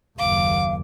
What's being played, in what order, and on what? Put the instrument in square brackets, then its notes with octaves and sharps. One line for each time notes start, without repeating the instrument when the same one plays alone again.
[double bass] F#1 D#2 [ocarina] F5 [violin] D6